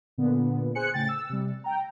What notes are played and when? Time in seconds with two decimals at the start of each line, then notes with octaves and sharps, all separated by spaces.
0.18 A#2 D3 B3
0.75 G#4 C5 G#5 F#6 C#7
0.94 A2 C#3 G5 A6
1.09 E6
1.29 C3 G3
1.64 G5 A#5